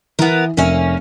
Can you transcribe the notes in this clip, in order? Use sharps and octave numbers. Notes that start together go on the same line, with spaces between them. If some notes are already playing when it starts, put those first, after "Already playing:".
E3 B3 A#4
F1 A#3 C#4 E5